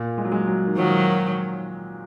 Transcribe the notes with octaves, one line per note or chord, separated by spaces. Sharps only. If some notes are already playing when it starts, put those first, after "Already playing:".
Already playing: A#2
G#3
F#3
G#3
F#3
D#3
D#3 F3 F#3